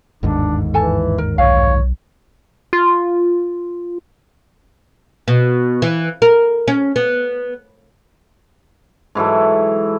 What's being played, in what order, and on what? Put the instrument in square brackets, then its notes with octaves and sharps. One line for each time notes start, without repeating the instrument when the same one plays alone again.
[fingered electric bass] G1 D#2 G#2 [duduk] D4
[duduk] E3 [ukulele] A4 G#5 A5
[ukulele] A#4
[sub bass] B1 [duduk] C#5 [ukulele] F5
[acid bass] F4
[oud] B2
E3
A#4
C#4
B3
[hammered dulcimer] G#2 E3 F#3 A4